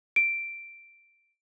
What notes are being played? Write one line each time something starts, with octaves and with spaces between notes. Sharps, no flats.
D7